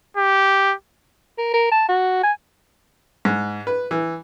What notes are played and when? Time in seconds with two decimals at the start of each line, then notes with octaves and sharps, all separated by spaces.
0.17 G4
1.38 A#4
1.54 A#4
1.71 A5
1.88 F#4
2.23 G#5
3.25 G#2
3.67 B4
3.91 E3